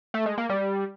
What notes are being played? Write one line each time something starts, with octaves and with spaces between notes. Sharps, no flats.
A3
G#3
A#3
G3